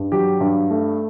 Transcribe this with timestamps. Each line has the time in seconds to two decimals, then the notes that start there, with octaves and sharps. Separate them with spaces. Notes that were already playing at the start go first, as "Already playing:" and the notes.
Already playing: G2
0.12 F#3 G4
0.41 G2
0.71 A3